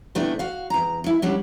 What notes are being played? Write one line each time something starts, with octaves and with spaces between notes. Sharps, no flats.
B2 D#3 A3 C4 D4 E4
F#4 F5
E2 A#5
D#3 E4
C#3 F#3 G3 D4